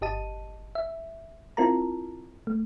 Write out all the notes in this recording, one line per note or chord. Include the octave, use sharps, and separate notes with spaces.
G1 G4 D#5 A5 D#7
E5
C4 E4 F4 A#4 A5 A#5
A3